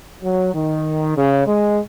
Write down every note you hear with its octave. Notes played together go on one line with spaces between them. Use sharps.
F#3
D#3
C#3
G#3